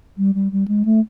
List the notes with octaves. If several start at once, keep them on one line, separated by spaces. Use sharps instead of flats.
G3
G3
G3
G#3
A3